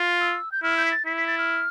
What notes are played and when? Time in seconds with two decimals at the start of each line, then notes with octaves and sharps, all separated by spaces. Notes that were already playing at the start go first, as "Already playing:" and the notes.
Already playing: F4
0.21 E6
0.52 G6
0.63 E4 F6
0.77 G6
0.85 B6
0.92 A6
1.06 E4 B6
1.17 B6
1.27 A6
1.38 F6